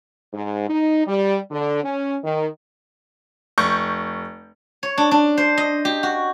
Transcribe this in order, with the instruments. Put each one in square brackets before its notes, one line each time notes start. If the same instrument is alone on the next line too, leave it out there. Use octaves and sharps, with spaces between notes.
[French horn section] G#2
D#4
G3
D3
C#4
D#3
[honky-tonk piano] F1 C#6 G6
[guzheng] C#5
D4
D4
C5
D#5
G4
F#4